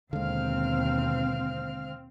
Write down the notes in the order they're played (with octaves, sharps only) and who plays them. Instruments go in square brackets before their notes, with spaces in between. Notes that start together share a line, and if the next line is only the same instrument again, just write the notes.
[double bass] D#2 B2 [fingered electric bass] D3 G#3 [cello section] C4 [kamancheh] F5 F6